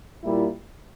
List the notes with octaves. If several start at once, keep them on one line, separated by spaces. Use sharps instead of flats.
A#2 G3 A#3 E4